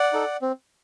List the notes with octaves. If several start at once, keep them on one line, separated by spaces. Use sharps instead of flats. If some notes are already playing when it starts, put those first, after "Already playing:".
Already playing: D5 F#5
D#4 A4
C4